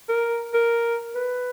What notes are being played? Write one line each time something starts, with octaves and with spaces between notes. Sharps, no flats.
A#4
A#4
B4